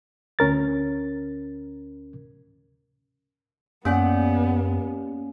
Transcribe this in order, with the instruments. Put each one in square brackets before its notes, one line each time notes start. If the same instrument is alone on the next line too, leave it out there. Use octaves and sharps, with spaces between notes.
[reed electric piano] D2 C#4 A#4 A6
[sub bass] F#2 [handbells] A#3 C#4 [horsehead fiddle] B3 [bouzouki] G4 D5 F#5